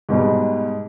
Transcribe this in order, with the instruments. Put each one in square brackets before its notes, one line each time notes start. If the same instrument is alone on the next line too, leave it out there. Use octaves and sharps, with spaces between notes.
[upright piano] G#2 B2 G3